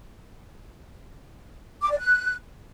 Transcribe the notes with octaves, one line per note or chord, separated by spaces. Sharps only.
D6
D5
F#6